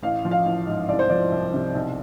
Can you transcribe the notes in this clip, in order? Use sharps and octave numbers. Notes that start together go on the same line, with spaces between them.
A1 F5
F3
F5
A1
G#2
C2 D5
C5
F3 D5
C2
C3
B1